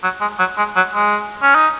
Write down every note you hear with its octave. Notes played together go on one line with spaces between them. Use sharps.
F#3
G#3
F#3
G#3
F#3
G#3
C#4
D#4